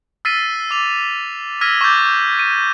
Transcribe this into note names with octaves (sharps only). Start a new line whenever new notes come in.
E6 F6 A6 B6 C7 D#7
D6 E6 F7
E6 F6 G#6 A#6 B6 D#7
C#6 D6 E6 G6 A6
D#7